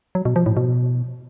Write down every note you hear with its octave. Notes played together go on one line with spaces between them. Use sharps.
F#3
B2
F3
A2
B2